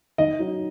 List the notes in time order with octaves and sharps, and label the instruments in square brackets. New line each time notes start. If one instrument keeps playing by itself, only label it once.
[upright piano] D#3 [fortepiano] D#5
[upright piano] F#3 D#4